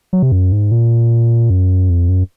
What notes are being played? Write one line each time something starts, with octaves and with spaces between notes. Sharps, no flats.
F#3
C3
F#2
G#2
A#2
F#2
F2
F#2